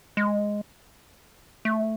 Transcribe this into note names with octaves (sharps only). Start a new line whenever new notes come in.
G#3
A3